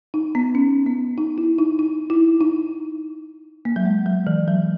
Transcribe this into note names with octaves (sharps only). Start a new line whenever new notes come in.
D#4
B3
C#4
B3
D#4
E4
D#4
D#4
E4
D#4
A#3
F#3
G#3
F#3
E3
F#3